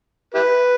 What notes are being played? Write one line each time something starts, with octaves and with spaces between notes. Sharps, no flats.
E4 G4 B4